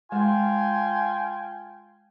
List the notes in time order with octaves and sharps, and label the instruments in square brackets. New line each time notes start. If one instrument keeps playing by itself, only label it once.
[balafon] G#3 [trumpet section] F4 G5 G#5